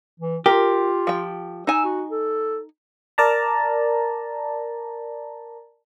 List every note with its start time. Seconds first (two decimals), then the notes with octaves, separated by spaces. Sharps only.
0.20 E3
0.46 F4 G4 A#4
1.07 F3 G5
1.67 D#4 G#5 E6
1.85 F#4
2.11 A4
3.18 A#4 D5 A5 A#5